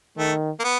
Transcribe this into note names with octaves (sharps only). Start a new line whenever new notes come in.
D#3 A3
A#3
B3